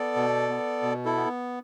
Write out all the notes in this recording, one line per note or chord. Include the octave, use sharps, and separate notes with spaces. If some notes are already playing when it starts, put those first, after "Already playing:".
Already playing: B3 A4 D5
B2
B3
B2
E4 A4
B3